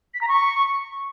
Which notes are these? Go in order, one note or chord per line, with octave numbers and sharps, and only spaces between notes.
B6
A#5
C#6